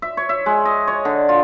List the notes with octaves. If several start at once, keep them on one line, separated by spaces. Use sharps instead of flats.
E5
C#5
E5
G#3
D#5
C#5
D3
F4